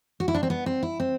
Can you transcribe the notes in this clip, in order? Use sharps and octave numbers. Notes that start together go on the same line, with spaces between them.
F#4
E4
D4
C4
B3
C4
E4
C4